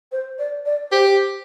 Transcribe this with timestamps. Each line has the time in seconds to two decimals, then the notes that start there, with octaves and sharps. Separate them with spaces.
0.12 C5
0.39 D5
0.65 D5
0.91 G4 C5